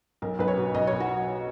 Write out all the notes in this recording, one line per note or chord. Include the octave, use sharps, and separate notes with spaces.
B1 A#4
B1 B4
C#5
B2
B1 D#5
B1 C#5
F#4